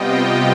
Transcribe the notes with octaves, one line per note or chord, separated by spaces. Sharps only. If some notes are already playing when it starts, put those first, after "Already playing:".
Already playing: C3 G3 B3 F4 D#5 G5